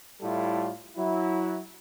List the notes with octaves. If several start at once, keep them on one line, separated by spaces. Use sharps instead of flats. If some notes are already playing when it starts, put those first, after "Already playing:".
A2 G3 E4 F4 A4
F#3 E4